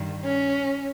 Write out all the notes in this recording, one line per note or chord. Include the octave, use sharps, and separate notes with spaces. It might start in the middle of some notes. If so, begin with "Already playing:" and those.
Already playing: G2 D#3
C#4